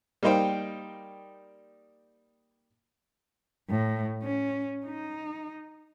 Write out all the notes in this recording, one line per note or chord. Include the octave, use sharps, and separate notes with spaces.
G3 A#3 D#4 C5 G5
A2
C#4
D#4